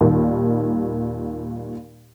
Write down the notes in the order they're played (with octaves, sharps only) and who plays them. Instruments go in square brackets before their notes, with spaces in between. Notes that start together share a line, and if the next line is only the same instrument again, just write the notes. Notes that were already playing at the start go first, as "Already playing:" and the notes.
[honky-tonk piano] D#2 A#2 D#3 G3